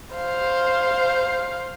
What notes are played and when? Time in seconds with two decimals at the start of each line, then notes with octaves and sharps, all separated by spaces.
0.16 C5 F5